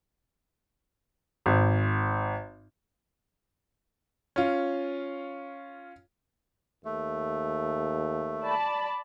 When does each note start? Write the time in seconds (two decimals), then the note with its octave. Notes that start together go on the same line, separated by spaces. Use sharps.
1.46 G#1
4.36 C#4 F4
6.85 D#2 A3
8.42 D5 A5 B5